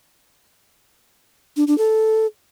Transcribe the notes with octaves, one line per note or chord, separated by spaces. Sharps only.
D4
D4
A4